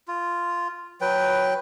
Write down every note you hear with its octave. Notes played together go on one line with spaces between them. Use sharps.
F4
F#3 B4 G5